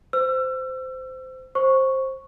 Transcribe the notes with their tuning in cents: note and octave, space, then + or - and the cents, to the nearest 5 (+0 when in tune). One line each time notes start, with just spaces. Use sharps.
C5 -20 E6 +35
C5 +15 C#6 +0